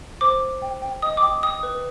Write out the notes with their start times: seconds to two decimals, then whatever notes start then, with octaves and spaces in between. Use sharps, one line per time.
0.21 C5 D6
0.41 C5
0.62 G5
0.82 G5
1.02 D#5 D#6
1.17 D6
1.22 G5 D#6
1.43 G5 D#6
1.63 B4